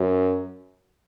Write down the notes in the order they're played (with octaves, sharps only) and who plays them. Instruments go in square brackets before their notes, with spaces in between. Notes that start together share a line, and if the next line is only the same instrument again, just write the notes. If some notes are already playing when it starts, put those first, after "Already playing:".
Already playing: [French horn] F#2